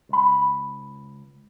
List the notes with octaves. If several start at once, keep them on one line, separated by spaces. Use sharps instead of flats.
C#2 B5